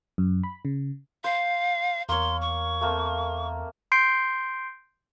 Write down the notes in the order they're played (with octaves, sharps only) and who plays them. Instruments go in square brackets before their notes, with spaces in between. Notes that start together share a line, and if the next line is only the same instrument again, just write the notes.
[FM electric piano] F#2
B5
C#3
[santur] C5 [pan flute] F5
[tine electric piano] E2 [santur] A#3 C#5 [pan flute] C6
[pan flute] C#6
[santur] A3 A#3 C4
[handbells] C6 G6 C7 D7